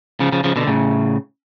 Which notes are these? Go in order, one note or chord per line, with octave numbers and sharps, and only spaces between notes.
C#3 F3
C#3 F3
C#3 F3
B2 D3
A2 C#3